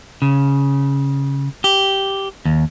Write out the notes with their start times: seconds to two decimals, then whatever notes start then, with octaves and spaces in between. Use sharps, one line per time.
0.22 C#3
1.64 G4
2.45 D#2